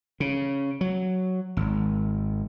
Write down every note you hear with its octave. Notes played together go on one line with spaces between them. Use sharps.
C#3
F#3
G#1